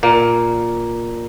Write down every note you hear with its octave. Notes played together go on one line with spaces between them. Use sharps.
A#2 A#3